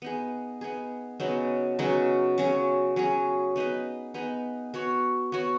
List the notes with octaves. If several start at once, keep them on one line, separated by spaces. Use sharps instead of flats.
B3 D#4 G#4
B3 D#4 G#4
C#3 F#3 B3 D#4
C#3 F#3 B3 D#4
F#3 C#4 G#4
F#3 C#4 G#4
B3 D#4 G#4 B4
B3 D#4 G#4 B4
B3 F#4 C#5
B3 F#4 C#5